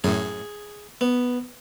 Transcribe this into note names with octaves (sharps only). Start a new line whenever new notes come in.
F#2 A2 G#4
B3